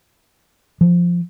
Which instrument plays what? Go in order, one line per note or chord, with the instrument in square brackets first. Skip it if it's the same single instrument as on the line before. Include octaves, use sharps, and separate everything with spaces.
[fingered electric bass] F3